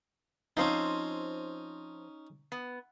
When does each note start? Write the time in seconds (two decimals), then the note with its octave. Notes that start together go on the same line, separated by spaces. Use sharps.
0.57 F3 C4 C#4 D#4 C5
2.52 B3